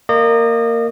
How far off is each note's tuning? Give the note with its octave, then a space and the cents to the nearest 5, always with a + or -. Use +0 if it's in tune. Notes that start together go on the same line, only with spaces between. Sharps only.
A#3 -10 D#5 -30